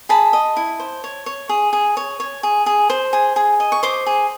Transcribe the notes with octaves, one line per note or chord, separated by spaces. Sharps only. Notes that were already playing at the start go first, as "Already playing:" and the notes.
G#4 A5 B5
D#5
E4
C5
C#5
C#5
G#4
G#4
C#5
C#5
G#4
G#4
C5
G#4
G#4
D#5
C#6
C5 C6 D6
G#4